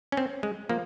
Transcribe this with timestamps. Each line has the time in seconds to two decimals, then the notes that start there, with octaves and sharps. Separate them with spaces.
0.12 C#4
0.17 C4
0.43 G#3
0.69 F3 A#3